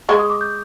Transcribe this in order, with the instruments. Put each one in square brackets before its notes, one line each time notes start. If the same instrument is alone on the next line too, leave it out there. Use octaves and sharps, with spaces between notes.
[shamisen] G#3 [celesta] C#6
[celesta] D#6
D6
G6